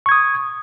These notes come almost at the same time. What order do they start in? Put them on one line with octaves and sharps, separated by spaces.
C#6 G#6 D#6